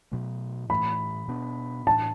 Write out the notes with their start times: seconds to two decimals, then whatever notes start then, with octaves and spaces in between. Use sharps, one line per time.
0.11 B2 F#3 A3
0.70 A2 E3 A3 B5
1.28 B2 B3 D4
1.87 A2 E3 D4 A5